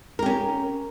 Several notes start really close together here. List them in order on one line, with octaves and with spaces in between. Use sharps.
A#4 G4 C#4